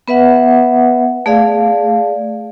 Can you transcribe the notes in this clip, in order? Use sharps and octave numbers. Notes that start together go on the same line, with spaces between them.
B3 B4 E5 F#5
A3 G#4 D5 F5